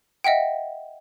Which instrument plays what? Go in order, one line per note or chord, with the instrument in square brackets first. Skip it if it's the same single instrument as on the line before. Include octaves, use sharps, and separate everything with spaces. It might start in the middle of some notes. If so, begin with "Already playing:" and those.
[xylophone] D#5 E5 F#5 G5